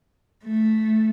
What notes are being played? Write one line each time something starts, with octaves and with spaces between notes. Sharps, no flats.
A3